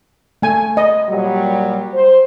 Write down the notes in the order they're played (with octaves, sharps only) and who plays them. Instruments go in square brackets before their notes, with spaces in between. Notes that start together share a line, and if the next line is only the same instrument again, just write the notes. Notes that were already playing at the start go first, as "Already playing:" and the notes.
[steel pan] A3 G#5
D#5
[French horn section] A#2 F#3 G3
C5